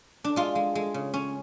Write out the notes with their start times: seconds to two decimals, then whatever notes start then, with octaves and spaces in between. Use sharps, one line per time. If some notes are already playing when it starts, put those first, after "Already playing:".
0.24 D4
0.36 G#3 F4
0.55 G#3
0.75 G#3
0.94 C#3
1.14 C#4